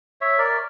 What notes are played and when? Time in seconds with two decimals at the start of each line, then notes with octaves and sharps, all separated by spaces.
0.21 C#5 E5
0.38 A#4 D5